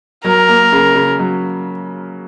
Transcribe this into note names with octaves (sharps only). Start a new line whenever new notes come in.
F#3 A#4
A#3
C#3
C#3
F#3